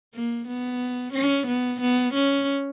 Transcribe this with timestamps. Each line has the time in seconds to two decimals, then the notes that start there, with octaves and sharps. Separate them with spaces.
0.14 A#3
0.47 B3
1.13 C#4
1.47 B3
1.81 B3
2.14 C#4